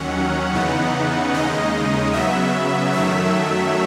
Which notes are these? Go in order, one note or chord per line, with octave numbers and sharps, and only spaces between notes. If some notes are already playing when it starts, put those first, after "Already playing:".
Already playing: D#2 D#3 F#3 C#4 F#5
E2 C#3 E3 B3 D#4
D#2 C#3 G#3 D#4 D#5
C#3 F#3 B3 E5
F#2 D#3 F#3 A3 E5